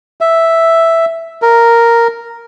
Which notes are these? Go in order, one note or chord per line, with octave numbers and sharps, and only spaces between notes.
E5
A#4